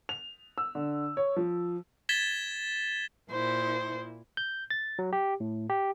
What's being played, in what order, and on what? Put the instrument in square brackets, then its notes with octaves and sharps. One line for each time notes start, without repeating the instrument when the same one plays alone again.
[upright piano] F7
E6
D3
C#5
F3
[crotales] G#6 A6 B6 E7 G7
[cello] A#2 E4 [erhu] C5
[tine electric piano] G6
A6
F#3
G4
A2
G4